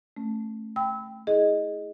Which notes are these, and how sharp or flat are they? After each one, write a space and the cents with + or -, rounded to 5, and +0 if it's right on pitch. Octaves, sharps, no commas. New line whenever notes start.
A3 +0 C#4 -20
G5 +0 B5 +25 E6 -25
E4 -30 G#4 +0 D#5 +0